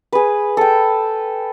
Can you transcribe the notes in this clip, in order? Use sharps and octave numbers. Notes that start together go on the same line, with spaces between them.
G#4 B4
A4 G5